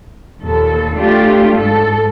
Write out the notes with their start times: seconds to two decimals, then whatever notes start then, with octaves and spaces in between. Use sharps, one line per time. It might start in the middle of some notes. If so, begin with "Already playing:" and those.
0.42 D#2 A#2 A4
0.97 A3 D4 F4 G4
1.57 G#2 A4